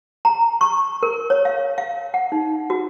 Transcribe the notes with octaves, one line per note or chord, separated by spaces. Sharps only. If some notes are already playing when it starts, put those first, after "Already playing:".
A#5
C#6
A#4
C#5
F5
F5
F#5
D#4
F#4